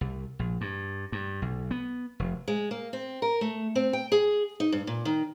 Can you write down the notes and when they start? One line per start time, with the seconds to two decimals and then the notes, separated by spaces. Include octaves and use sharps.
0.01 C2
0.39 A#1
0.61 G2
1.12 G2
1.42 B1
1.71 B3
2.20 F1
2.48 G#3
2.71 A#3
2.93 C4
3.22 A#4
3.41 A3
3.75 C4
3.93 G5
4.12 G#4
4.60 D#4
4.72 G2
4.87 A#2
5.05 D#3